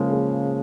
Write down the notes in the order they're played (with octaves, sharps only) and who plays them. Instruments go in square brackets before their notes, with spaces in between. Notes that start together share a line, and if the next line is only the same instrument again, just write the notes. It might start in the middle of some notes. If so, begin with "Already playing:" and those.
Already playing: [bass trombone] C#3 [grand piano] F3 G#3 A#3
[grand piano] A#3